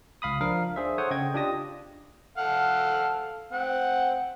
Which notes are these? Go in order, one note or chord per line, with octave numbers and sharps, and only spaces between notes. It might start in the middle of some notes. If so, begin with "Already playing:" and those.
C#2 F5 B5 D#6
F3 D4 A#4 F5
D4 G#4 C5 E5
A4 C5 C#5 F#5 D#6
C#3 D#5 G5 G#6
D4 F4 G4 A5 D#6 A#6
A4 F5 F#5
C4 F#5